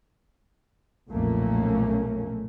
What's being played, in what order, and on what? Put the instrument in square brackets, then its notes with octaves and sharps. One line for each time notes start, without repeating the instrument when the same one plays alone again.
[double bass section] B1 F2 A#2 A3 A#3 C#4